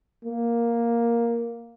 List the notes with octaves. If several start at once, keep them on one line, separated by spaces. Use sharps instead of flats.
A#3